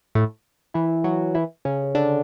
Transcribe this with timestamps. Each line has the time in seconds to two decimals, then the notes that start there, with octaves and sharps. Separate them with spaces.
0.15 A2 A3
0.74 E3 E4
1.04 F#3 F#4
1.35 E3 E4
1.65 C#3 C#4
1.95 D3 D4